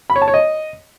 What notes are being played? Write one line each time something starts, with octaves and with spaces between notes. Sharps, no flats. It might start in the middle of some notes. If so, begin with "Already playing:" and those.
B5
C#5
A5
C#5
D#5